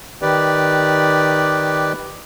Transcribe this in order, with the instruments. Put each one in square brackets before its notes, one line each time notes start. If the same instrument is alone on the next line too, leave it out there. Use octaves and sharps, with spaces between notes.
[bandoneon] D#3 G4 B4 D5